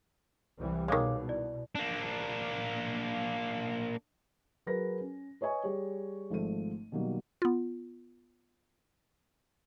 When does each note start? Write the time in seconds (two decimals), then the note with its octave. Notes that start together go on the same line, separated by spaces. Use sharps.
0.58 C2 E3 G3
0.88 B2 D#3 G#3 C#5 F5 D6
1.28 E4 D5
1.75 A#3 D4
4.66 F#3 G#4 A#4 B4 A#6
5.01 C#4
5.41 B4 C#5 D#5 G#5 C#6
5.64 G3 G4 G#4 C#5
6.30 G#1 F3 A3 D#7
6.92 B2 D#3 F#3 G3 A#3
7.42 B3 F4